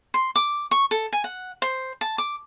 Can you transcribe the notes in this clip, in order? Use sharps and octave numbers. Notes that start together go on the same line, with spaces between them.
C6
D6
C#6
A4
G#5
F#5
C5
A5
D6